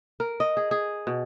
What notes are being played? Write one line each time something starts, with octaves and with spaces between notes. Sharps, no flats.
A#4
D#5
G#4
G#4
B2